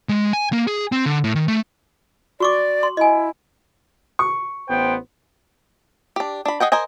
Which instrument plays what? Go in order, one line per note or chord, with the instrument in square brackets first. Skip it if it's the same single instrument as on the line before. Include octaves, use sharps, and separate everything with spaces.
[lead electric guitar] G#3
G#5
A#3
G#4
C4
D3
A2
D#3
A3
[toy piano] F#4 C#6 D6 [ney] D5
[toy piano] C6
[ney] E4 [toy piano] D#5 G#5
[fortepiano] C#6
[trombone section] A1 B3 C5 [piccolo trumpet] G5
[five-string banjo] D4 G4
D4 B5
G#4 D#5 F#5 G5
A#4 C5 D#5 G#5